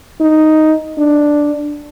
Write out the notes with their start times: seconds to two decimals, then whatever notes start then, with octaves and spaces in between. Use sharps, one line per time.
0.21 D#4
0.98 D4